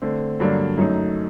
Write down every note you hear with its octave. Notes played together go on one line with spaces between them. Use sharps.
D3 A3 C4
G2 D3 F#3 A#3 D4
F#2 F#3 A3 D#4